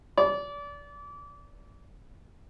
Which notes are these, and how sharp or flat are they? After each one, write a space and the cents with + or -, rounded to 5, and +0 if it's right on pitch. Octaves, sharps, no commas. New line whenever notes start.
D5 -30